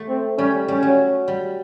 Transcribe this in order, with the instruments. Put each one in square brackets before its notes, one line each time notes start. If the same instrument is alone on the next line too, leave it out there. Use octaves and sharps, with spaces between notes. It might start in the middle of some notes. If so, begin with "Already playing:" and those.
Already playing: [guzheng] A3
[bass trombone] C4
[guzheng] G3 [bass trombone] C#4
[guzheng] G3 [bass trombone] C#4
[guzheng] F#3
G3